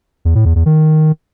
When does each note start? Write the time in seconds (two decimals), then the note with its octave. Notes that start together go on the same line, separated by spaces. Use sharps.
0.25 E2
0.35 A2
0.45 E2
0.56 E2
0.66 D#3